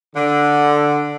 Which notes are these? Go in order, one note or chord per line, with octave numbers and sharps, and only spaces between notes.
D3